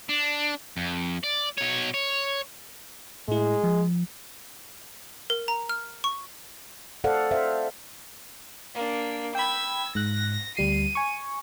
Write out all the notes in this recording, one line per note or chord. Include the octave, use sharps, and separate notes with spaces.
D4
F2
D5
B2 C#5
C#5
A2 G#3 E4
F3
A#4
A#5
F6
C#6
A4 C5 D5 F5 F#5
C5 E5 F5
A#3 D4
G5 B5 E6 G#6
G#2 F#6 A#6
D2 G3 C7 D#7
G#5 C#6